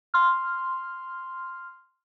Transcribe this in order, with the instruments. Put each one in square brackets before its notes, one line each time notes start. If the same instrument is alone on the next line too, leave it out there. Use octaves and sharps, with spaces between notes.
[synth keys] C6 F6